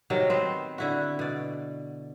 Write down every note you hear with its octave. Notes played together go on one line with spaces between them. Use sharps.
C3 D#3 F#3
B3 C4 C5
D3 E4 F#4
B2 D5